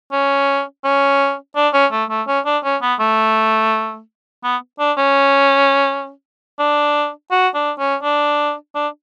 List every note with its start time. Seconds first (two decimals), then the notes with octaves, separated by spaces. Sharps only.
0.12 C#4
0.84 C#4
1.56 D4
1.73 C#4
1.92 A3
2.10 A3
2.27 C#4
2.46 D4
2.64 C#4
2.82 B3
2.99 A3
4.44 B3
4.80 D4
4.98 C#4
6.59 D4
7.31 F#4
7.55 D4
7.79 C#4
8.03 D4
8.75 D4